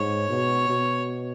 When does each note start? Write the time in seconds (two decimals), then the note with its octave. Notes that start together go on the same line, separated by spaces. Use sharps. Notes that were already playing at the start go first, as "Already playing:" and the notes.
Already playing: G#2 C#5
0.29 B2
0.69 B2